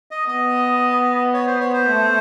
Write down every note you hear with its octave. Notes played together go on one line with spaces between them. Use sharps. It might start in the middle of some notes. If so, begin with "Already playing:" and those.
D#5
B3 D#5
C#5
C5
C#5
C5
A3